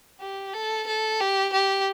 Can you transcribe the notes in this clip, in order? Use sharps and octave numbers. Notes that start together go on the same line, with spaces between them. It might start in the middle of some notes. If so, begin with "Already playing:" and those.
G4
A4
A4
G4
G4